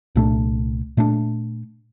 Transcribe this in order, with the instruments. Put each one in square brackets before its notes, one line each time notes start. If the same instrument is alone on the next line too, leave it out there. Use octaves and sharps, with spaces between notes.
[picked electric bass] C2 A#2 A3 D4
A#2 A3 D4